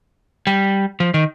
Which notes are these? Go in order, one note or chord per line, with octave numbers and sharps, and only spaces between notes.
G3
F3
D#3